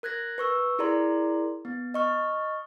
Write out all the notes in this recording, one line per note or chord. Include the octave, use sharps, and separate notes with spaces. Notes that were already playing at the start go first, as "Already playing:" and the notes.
A#4 F#6 G#6 A#6
B4 C#6 E6
E4 G#4 A#4 D5 A#5 C6
B3
D#5 C#6 F6